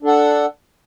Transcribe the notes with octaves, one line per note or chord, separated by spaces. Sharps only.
D4 A4 F#5